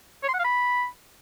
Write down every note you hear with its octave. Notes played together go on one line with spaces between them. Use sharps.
C#5
C6
F#5
F5
B5